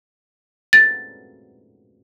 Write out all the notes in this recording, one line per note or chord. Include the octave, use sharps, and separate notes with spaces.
A6